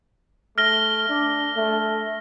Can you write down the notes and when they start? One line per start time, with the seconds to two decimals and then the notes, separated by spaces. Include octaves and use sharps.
0.58 A3 F6 A#6 G7
1.10 D4
1.57 A3